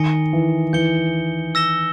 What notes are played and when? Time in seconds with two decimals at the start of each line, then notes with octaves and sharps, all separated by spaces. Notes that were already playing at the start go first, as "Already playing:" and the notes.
Already playing: D#3 G#5 D#6 A#6 C#7 G7
0.33 E3
0.73 E3 G6 C#7 G7
1.55 E6 A#6 E7 G7